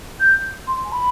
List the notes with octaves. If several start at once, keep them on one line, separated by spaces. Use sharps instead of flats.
G6
C6
G#5
B5